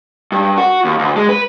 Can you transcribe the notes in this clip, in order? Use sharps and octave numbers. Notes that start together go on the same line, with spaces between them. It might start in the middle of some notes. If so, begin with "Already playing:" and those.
G2
F#4
D#2
D2
G#3
B4